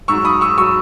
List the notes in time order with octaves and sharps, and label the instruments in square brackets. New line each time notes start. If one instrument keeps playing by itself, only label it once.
[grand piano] G#2 F#3 C#6 E6
B5 D#6
C#6 E6
F#3 C#6 E6